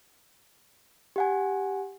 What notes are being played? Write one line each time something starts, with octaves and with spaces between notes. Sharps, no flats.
G4 F#5 G#5